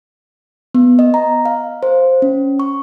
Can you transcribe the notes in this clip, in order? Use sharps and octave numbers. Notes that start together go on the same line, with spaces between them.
B3
D#5
A#5
F5
C5
C#4
C#6